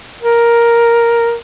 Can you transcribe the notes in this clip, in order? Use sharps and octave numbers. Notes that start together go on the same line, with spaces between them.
A#4